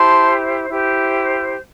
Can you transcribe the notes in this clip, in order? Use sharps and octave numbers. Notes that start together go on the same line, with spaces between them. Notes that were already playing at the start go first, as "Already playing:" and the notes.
Already playing: E4 G4 C5 A5 C6
E4 G4 C5